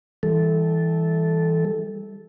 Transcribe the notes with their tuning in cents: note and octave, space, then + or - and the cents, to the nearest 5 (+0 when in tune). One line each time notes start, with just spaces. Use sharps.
E3 -10 G3 +25 A4 -10